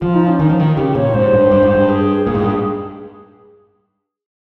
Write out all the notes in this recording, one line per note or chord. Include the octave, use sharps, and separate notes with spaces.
F3 F4
D#4
C#4
D#3 D#4
F3
D#3
C#3 G4
A#2 C#5
G#2 C5
G2
G2
G#2
G2
G#4
A#2
G#2
G2